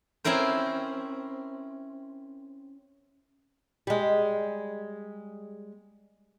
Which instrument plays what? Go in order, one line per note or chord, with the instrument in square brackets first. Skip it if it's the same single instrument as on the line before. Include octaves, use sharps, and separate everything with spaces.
[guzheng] C4 C#4 E4 A#4 C5
[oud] G3 G#3